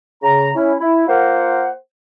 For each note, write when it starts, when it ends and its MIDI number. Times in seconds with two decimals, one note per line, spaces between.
0.22 0.49 49
0.22 0.49 82
0.55 0.73 61
0.55 0.73 64
0.80 1.07 64
1.08 1.69 58
1.08 1.69 65
1.08 1.69 70
1.08 1.69 72
1.08 1.69 78